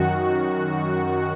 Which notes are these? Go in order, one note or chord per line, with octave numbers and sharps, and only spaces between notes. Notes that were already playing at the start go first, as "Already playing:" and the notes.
Already playing: F#2 D#3 F#4